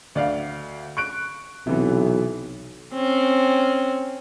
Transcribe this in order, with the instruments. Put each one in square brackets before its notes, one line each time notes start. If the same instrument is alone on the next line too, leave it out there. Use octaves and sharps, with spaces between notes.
[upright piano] D2 D5 F5
C#6 F#6 D7
[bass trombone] B1 [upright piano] C3 E3 B3
[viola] C4 C#4